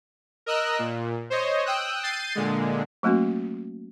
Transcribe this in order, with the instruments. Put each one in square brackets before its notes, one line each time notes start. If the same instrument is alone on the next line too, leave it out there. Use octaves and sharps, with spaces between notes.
[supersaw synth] A#4 D#5 E6 F#6
A#2
C5 C#5 D#5
G5 D#6 E6 F#6
G6 A6 C7 D#7
A#2 D3 G#3
[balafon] F#3 A3 A#3 C#4 F#4